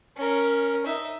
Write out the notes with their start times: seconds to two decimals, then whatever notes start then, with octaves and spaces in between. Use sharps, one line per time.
0.17 C#4 A#4
0.86 D#4 E5